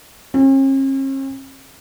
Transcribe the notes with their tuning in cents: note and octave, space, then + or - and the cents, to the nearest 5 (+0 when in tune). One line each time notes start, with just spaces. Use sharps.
C#4 -45